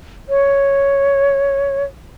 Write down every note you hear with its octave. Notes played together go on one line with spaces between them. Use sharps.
C#5